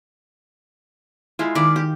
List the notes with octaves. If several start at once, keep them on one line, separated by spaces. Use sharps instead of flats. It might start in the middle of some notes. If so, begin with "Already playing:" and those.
G#3 E4 F4
D#3 E4 D5 F5
G4